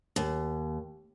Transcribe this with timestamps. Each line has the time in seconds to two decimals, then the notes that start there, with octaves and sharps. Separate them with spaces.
0.16 D#2